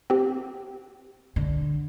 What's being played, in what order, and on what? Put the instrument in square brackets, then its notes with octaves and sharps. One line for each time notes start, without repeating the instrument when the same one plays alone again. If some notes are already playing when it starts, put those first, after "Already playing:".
[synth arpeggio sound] C4 G4
[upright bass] D3